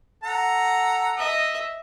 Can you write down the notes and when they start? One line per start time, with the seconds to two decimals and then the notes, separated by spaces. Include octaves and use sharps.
0.24 A4 F#5 A#5
1.17 D#5 E5